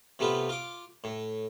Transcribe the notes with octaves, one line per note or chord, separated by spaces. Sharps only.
C3 A3 B3 F4 B4
F4 D6
A2